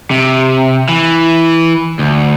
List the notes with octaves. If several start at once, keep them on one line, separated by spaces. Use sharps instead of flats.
C3
E3
D2